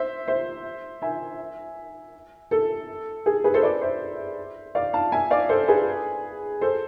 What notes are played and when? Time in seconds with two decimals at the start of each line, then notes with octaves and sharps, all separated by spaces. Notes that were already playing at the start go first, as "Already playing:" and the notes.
Already playing: C5 E5
0.28 C5 E5
1.02 E5 G#5
2.51 A4
3.26 G#4
3.44 G#4 B4
3.54 A4 C5
3.63 B4 D5
3.81 C5 E5
4.75 D5 F5
4.93 F5 A5
5.12 E5 G#5
5.31 D5 F5
5.49 A4 C5
5.68 G#4 B4
6.61 A4 C5